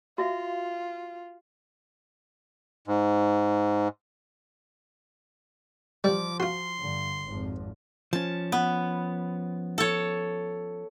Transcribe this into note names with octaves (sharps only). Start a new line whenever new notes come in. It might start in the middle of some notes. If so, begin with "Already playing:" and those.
F4 F#4 E5 F5
G#2
F3 G3 D6
F4 F#4 C6
G2 D3
G#1 F2
F3 C#4 A5
B3
A4 C#5